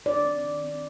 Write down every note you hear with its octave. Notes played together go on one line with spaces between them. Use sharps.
D#3 D5
C4
D#3
C4